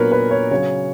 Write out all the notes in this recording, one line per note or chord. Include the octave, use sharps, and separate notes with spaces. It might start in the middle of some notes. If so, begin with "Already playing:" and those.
Already playing: A#2 F#3 B3 D4 A#4 B4 C#5
B4
C#5
C#3 F#3 C#4 C#5